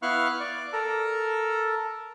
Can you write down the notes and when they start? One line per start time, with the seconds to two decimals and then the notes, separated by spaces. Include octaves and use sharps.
0.02 B3 E4 F5 C#6 F6 F#6
0.40 D5
0.73 A4 A#4